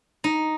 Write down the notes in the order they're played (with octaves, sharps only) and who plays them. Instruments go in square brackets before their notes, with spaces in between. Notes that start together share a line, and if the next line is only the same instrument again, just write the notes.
[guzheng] D#4